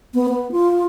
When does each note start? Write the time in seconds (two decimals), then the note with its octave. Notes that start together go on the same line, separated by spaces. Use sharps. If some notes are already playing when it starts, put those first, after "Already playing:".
0.14 B3
0.29 B3
0.52 F4